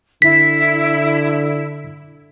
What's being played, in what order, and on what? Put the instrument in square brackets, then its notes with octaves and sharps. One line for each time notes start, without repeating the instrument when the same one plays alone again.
[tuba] D3 [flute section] E4 [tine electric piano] B6